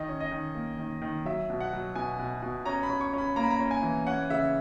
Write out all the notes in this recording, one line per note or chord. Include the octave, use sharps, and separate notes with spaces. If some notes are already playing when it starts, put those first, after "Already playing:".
Already playing: D#3 D#5
C#4
D#5
D#3
A#3
D#3
D#3
F#3 E5
B2
F#5
F#3
B2 G#5
B2
B2
C#4 A#5
B5
C#4
C#6
C#4 B5
A#3 A#5
B5
A#5
C#4
G#5
E3
C#4 F#5
C#3 E5